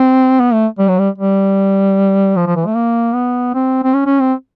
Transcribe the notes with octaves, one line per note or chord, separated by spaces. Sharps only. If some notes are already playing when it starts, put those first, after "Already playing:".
Already playing: C4
B3
A3
G3
F#3
G3
G3
F3
F3
E3
A3
A#3
B3
C4
C4
C#4
C#4
C4